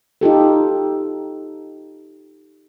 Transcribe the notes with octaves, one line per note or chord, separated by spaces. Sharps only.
D#4 F4 G4 A4